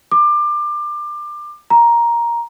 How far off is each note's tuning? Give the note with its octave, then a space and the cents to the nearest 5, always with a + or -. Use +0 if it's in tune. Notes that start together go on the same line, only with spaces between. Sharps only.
D6 +25
A#5 +10